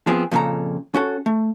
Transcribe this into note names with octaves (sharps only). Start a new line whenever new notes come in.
F3 B3 C4 G#4
F2 A#2 C#3 A4 A#5
C#4 F#4 A4
A3